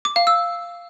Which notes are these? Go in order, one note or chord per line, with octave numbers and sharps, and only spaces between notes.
D6
F5
E6